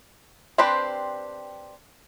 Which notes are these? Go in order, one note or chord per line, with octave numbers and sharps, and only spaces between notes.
C4 D4 G4 B4 C5